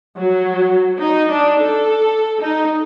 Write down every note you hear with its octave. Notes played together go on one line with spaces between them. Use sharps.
F#3
D#4
D4
A4
D#4